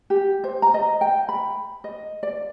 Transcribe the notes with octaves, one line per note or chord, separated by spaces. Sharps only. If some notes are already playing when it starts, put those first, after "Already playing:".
G4
C5
A#5
D#5
G5
B5
D#5
D5